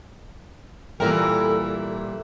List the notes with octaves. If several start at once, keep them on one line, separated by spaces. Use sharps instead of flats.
A#2 E3 G3 E4 A4 A#4 G5